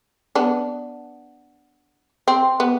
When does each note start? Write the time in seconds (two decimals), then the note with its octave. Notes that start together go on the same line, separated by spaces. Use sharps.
0.35 B3 D4
2.28 C4
2.60 B3